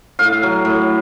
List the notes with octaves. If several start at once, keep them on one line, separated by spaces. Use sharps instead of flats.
A2 F5
F#3
A2